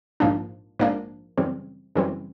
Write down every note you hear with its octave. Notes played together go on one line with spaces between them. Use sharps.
A#1 G#2 F3 A#3 D4
A#1 G#2 F3 A#3 D4
F#2 C#3 E3 G3 C4
F#2 C#3 E3 G3 C4